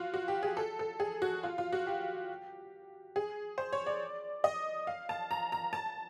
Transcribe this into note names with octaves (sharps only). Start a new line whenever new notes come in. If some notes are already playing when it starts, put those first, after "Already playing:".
Already playing: F4 F#4
F#4
G4
G#4
A4
A4
G#4
F#4
F4
F4
F#4
G4
G#4
C5
C#5
D5
D#5
F5
A5
A#5
A#5
A5